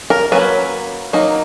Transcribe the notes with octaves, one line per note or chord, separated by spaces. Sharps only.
A#4
F#3 A#3 C#4 B4
F#3 A#3 D#4